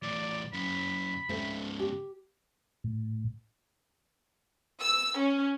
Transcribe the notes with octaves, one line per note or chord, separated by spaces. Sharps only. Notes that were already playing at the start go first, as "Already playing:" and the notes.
E2 A2 D5
F#2 C#3 B5
G#2 C#3 A3 C4
G4
A2
E6
C#4